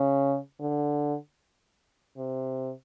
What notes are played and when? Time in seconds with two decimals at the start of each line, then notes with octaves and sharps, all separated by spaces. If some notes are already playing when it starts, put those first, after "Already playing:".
Already playing: C#3
0.60 D3
2.17 C3